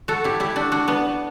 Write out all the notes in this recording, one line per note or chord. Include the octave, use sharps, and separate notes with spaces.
F#4 A4
E4 G4
E4 G4
D4 F#4
D4 F#4
B3 D4